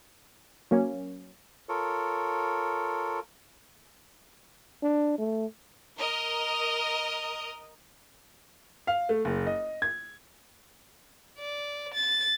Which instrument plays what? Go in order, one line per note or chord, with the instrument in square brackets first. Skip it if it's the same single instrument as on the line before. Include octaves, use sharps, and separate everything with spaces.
[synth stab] F#3 A#3 C#4
[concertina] F4 A4 A#4 C#5
[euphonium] D4
A3
[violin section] A#4 D#5
[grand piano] F5
A3
F#1
D#5
G#6
[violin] D5
A6